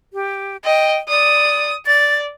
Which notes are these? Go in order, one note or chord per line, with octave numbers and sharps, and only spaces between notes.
G4
D#5 G5
D5 D#6
D5 A6